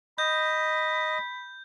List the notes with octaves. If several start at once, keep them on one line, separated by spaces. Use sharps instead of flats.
D#5 B5 G6